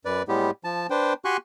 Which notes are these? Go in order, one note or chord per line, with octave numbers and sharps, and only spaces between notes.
F#2 B4 D5
A2 G3 G#3 B3 G4
F3 A5
D4 B4 C5 G5
F#4 G4 G#5 C6 C#6 F#6